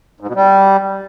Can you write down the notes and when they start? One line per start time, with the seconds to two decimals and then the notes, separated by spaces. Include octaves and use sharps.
0.20 G#2
0.28 B2
0.35 G3